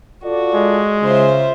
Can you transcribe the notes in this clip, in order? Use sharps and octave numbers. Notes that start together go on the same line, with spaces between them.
F4 F#4 A4 D5
G#3
C#3 F4 C5 E5